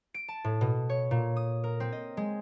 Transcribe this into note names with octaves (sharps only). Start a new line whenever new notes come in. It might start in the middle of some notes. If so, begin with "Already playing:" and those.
D7
A5
A2
B2
C#5
A#2
D#6
A#4
C4
D#5
G#3